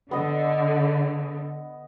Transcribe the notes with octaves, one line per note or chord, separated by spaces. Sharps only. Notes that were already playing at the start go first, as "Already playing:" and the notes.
D3 B3 D#5